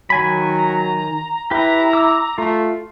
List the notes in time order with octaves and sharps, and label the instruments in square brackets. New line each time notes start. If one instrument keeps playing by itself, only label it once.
[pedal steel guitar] D#3 G#5 B5 [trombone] F#3
[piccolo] A#5
[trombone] E4 [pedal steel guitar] G4 B4 [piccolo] A#5
[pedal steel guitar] D6 E6
[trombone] A3 [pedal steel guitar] F4